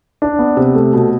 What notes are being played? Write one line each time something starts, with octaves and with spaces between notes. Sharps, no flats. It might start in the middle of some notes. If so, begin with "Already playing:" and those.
D4
B3
C3
A3
B2